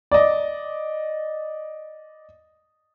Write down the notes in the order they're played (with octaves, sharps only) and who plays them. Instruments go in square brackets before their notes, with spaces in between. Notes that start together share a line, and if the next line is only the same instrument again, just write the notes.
[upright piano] D5 D#5